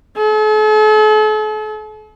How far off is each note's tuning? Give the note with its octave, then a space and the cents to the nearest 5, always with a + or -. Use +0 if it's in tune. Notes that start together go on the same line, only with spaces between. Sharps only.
A4 -45